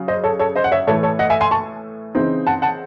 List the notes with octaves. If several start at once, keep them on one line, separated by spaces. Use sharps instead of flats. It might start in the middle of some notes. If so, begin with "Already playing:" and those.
Already playing: C#3 F#3
C5 D#5
A4 C#5
A4 C#5
C5 D#5
F#5
C#5 E5
A2 E3 A3 A4 C#5
A4 C#5
D#5 F#5
E5 G#5
G#5 C6
A5 C#6
C#3 E3 C4 D#4
F#5 A5
F#5 A5